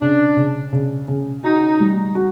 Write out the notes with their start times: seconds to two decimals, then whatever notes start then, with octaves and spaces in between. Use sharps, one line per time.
0.01 C#3 D4
0.37 C#3
0.73 C#3
1.08 C#3
1.43 D#4 F#4
1.80 G3
2.15 F#4